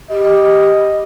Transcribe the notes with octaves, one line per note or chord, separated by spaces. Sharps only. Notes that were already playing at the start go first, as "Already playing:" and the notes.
G4 D#5